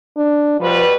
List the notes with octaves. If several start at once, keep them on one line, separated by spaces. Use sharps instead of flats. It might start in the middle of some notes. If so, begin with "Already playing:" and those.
D4
B2 F3 G3 B4